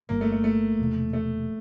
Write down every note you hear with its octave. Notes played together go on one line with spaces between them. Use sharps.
G1 G2 D#3 G3 A#3
A3
A3
A3
E1 E2 C3 F3
A3